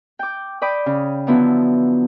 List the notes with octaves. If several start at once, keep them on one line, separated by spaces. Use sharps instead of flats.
G5 D6
D5 G5 B5 D6 D#6
C#3
D3 F3 F#3 B3 E4